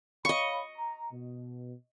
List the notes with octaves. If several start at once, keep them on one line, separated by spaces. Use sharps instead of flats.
C#5 D#5 F5 B5 C#6
A#5
B2